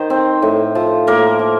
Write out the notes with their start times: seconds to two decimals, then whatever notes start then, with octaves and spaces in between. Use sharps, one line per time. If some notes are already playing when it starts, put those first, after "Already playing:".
Already playing: D#3 C5
0.10 C4
0.42 A2
0.75 F3
1.07 A2 A#3 A#4
1.39 F3